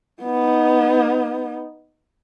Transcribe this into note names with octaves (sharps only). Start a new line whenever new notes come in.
B3 D#4